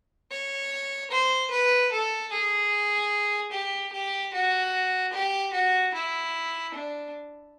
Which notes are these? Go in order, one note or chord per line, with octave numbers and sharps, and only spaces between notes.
C#5
C5
B4
A4
G#4
G4
G4
F#4
G4
F#4
E4
D4